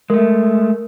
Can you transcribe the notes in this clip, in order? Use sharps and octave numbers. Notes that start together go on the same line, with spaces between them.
G#3 A3 A#4